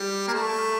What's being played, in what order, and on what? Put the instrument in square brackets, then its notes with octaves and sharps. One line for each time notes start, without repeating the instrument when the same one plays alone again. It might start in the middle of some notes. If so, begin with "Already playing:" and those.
Already playing: [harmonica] G3
A#3
A3